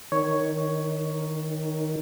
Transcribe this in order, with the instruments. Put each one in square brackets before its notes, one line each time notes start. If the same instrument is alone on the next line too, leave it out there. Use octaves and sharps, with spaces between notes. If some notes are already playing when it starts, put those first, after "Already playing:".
[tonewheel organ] D#3 [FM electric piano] C#5